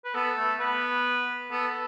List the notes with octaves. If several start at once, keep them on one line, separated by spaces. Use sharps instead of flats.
B4
B3 A4
A3
B3 B4
B3 A4